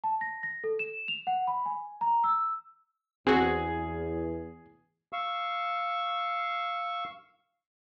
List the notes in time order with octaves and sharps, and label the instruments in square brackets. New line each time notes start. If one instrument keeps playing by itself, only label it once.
[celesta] A5
A#6
A#6
A4
E7
F7
F#5
B5
G#5
A#5
E6
[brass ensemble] E2 [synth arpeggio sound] C4 F#4 [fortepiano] G#4
[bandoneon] F5 C#6 E6